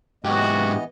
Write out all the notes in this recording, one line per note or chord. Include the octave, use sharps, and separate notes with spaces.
G#2 E3 B3 F#4 G4 D#5